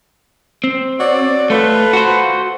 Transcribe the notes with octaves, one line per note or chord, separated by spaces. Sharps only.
C4
F#4 C#5 D5
A3 F4 A4 B4
F#4 C5